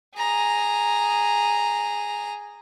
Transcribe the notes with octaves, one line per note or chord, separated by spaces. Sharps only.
G#4 A#5